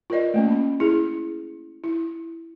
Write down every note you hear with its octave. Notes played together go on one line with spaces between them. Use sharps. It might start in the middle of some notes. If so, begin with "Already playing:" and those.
F4 A#4 B4 D5 D#5
A3 A#3 C#4
B5
E4 G#4
E4